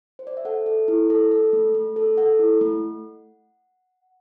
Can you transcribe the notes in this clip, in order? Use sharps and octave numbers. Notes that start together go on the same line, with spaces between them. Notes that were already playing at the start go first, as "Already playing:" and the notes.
C5
D5
E5
A4 F#5
A4
E4
A4
A4
A3
A3
A4
A4 F#5
E4
A3